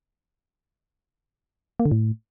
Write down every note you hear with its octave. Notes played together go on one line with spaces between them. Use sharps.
A#3
D3
A2